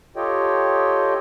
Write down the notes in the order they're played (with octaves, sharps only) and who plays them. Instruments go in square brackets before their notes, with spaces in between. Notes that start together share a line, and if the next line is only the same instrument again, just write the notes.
[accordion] F4 G4 A4 C#5 D#5 G5